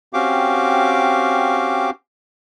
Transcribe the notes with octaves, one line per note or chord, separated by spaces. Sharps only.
C4 C#4 F#4 G4 F5 D6